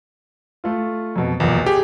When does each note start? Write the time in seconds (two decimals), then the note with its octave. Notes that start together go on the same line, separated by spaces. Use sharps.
0.64 A3 F4
1.16 F2 B2
1.40 B1 E2 A#2
1.66 G4 G#4